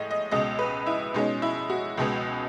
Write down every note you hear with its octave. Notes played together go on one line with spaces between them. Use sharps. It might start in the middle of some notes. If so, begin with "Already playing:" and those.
Already playing: A2 G#3 D#5
D#5
C#2 B2 G#3 D#5
B4
E4
B2 G#3 C#4 D#4
E4
F#4
C#2 B2 G#3 B3